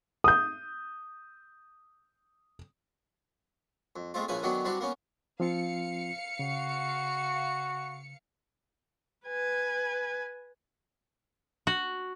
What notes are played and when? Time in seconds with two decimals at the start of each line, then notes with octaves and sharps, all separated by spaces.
0.24 D#6 G6
3.96 F2
4.14 G#3 A3 C4 F4
4.28 A#1 C#3 F3 E4 B4 G#5
4.43 D3 D#3 F#3 B3 C#4 D4
4.65 E3 G3 C4 D4 F#4
4.80 A#3 B3 C#4
5.40 F3 C4 F4 F5 C#7
6.39 C#3 F#4
9.27 B4 G#5
11.67 F#4